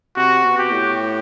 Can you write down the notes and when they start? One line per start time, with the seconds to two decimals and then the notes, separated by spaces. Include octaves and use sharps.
0.16 C3 F#4
0.43 B2
0.58 G4
0.71 A2